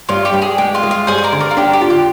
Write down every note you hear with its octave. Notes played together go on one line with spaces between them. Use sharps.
G2 F4
G4
G2
G#4
G#3 G4
F4
G#3
F4
G2 G#4 C5
C5
A#4 D5
D3
A#4 D5
F4
D4 G4
G4
F4
G4